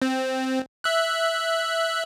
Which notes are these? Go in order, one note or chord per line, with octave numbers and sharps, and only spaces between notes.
C4
E5 F#6